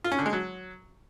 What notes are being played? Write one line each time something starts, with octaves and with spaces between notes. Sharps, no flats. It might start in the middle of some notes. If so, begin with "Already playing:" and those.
F4
C#4
D3
G#3
F#3